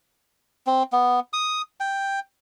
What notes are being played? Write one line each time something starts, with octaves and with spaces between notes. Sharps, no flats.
C4
B3
D#6
G5